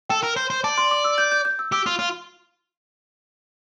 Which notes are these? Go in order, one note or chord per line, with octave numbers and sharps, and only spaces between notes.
A4 G5
A#4
C5
C5
D5 A5
C6
D6
E6
G6
G6
G6
E6
G4 E6
F4
F4